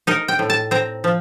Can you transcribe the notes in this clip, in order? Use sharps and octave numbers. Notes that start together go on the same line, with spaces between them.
D#4 A#4
G5
A2
A5
C4 A#5
F3